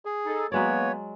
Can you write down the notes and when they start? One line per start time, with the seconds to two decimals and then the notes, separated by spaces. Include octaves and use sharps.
0.05 G#4
0.26 D#4 A4
0.52 F#3 G#3 A#3 B3 B4 C#5 D5